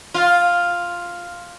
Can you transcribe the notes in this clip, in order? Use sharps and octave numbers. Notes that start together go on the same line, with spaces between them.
F4